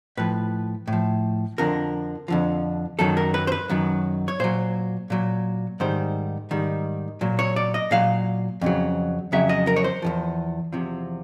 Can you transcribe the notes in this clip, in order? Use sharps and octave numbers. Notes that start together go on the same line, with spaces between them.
A2 F3 B4
A2
F3
F2 D3 F3 A#4
F2 D3 F3
F#2 D#3 F#3 A4
A#4
B4
C5
B4
F#2 D#3 F#3
C#5
A#2 F#3 C5
A#2 F#3
G#2 D#3 G3 C5
G#2 D#3 G3
A#2 F#3
C#5
D5
D#5
A#2 F#3 F5
F2 C#3 F#3
F2 C#3 F#3 E5
D#5
A#4
C#5
C5
E2 C3 F3
E2 C3 F3